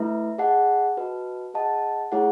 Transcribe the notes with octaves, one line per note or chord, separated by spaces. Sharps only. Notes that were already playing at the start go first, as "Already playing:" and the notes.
Already playing: A3 E4 B4 E5
G#4 D#5 F#5 A5
F#4 B4 D#5 A5
G#4 D#5 F#5 A5
A3 E4 G#4 C#5 F#5